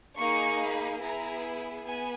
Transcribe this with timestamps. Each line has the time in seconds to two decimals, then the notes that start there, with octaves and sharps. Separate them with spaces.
0.17 A#3 D#4 G#4 C#6
0.59 B5
1.01 B3 E4 G#4 A#5
1.85 B3 G#5